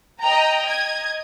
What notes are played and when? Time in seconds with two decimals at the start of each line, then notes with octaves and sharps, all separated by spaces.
0.21 D#5 G5 A#5
0.65 D#5 G#6